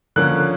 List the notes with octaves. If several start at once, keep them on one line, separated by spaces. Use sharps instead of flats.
D3 F3 A#3 C#4 F#6